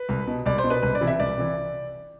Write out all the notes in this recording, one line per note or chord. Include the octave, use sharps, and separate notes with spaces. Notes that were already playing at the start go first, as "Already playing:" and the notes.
Already playing: B4
C2
B2
C2 D5
C5
B2
B4
C2 B4
D5
C3 E3
E5
C2 D5
C3 E3